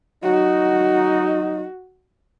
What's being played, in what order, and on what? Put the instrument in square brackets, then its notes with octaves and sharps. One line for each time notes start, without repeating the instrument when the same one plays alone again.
[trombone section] F#3 D#4 [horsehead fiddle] F#4